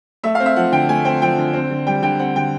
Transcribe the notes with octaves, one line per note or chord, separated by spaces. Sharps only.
A3 E5
F5
C4
E5
F3 F#5
D3 G5
A3 G#5
C4 G5
F3 G5
D3
C4
D3
G3 G5
D3 G5
C4 F#5
D3 G5